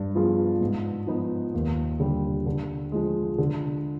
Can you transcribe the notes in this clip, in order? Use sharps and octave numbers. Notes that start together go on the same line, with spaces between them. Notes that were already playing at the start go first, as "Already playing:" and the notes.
Already playing: G2
F3 B3 F4 G#4
G#2
F3 B3 D#4
D#2
D3 G3
D3
F3 G#3
D3